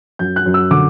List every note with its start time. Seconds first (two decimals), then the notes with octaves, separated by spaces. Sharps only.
0.19 F#2 G6
0.36 F#6
0.46 F#2
0.54 E6
0.71 D3 D6